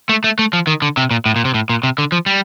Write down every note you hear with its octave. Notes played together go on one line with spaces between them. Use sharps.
A3
A3
A3
F3
D#3
D3
C3
A#2
A2
A#2
C3
A2
A#2
C3
D3
F3
G3